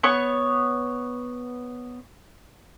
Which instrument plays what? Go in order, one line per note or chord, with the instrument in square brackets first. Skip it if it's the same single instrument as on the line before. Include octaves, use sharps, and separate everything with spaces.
[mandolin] B3 C#5 C#6